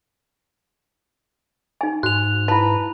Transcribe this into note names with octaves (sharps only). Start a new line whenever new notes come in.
D#4 G#5
G#2 F#4 F#6 F7
E4 B4 A5